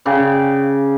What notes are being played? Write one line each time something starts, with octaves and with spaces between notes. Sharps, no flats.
C#3 D5 G5